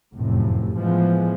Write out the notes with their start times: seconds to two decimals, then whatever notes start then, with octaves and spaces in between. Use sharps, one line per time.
0.16 F1 F#2 A2 C3
0.79 A2 E3 F3 G#3 B3